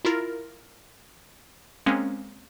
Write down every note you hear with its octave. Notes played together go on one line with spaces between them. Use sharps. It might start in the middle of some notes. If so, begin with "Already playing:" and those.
E4 F4 A#4
G#3 A#3 C4 C#4